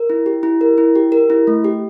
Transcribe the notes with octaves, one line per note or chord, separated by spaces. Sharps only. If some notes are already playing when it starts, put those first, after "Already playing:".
Already playing: A#4
E4
G4
E4
A#4
E4
G4
A#4
E4
A3
G4